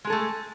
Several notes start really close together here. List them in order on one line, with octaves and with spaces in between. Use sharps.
G#3 G#4 A4 A3